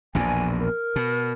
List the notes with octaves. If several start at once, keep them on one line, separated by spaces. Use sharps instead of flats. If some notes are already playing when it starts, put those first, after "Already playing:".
A#1 E2 B2 G#5
A#4
B2